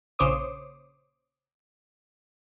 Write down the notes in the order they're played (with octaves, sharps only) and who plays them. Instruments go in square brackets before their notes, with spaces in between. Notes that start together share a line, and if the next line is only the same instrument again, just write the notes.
[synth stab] A#1 C#3 C5 C#5 D6 D#6